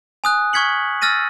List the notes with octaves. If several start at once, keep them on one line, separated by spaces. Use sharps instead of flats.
G#5 D#6 F#6
C#6 F6 G#6 B6 C#7 F#7
E6 F6 A6 A#6 D#7